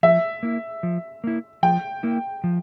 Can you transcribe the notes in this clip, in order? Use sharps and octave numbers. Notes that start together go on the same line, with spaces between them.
F3 E5
A#3 E4
F3
A#3 E4
F3 G5
A#3 E4
F3